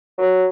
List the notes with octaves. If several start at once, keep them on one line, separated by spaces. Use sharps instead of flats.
F#3